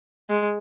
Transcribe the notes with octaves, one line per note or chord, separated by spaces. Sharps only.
G#3